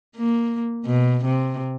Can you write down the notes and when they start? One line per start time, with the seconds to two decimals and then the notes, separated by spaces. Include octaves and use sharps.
0.17 A#3
0.85 B2
1.25 C3